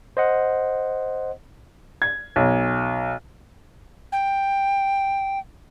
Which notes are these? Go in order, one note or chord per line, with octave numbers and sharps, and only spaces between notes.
C5 D#5 F#5
G#6
B1
G5